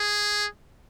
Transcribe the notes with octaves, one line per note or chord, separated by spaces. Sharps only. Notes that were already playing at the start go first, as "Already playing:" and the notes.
Already playing: G#4